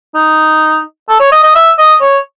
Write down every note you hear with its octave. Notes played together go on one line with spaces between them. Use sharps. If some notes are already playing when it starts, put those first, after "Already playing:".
D#4
A4
C#5
D#5
D#5
E5
D#5
C#5